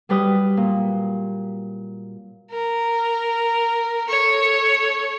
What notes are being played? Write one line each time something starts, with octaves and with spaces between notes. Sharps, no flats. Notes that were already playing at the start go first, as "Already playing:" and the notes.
F#3 G3 B4 G5 D#6
A#2
A#4
A4 C#5